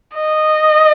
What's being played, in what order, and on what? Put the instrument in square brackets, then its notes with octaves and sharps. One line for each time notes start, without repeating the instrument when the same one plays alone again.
[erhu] D#5